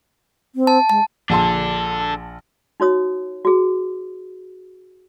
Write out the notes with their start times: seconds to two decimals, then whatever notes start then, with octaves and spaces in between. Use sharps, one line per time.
0.55 C4
0.67 A5
0.90 G#3 A5
1.30 A#1 D4 A4 A5 C6
2.80 D#4 F#4 C#5 D#6
3.45 F#4 G#4